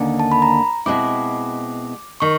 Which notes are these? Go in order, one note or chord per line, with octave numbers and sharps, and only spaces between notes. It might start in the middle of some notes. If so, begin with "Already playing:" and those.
Already playing: D#2 D3 A#3 C#4
A5
B5
A#5
B2 G#3 C4 E4 D6
D#3 C#6